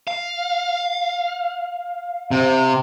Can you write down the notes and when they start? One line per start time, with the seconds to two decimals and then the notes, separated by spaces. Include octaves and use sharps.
0.08 F5
2.32 C3